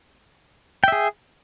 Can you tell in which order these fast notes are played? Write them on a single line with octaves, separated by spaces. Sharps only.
G5 E5 G#4